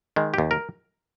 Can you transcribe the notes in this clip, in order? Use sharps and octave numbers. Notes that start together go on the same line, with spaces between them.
D#3 G#3
D#2 G4
A#4